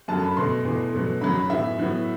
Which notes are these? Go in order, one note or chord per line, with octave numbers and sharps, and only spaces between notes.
F#2 F#3 A3 A5
B5
B2 A3 C6
E2 B2 A3
B2 F#3 A3
F#2 D#3 F#3 B5
B5
A2 E3 B3 E5
A2 F#3 B3